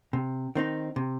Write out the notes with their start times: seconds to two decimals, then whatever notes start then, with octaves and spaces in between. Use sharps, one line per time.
0.13 C3
0.55 D#3 C4 D#4
0.96 C3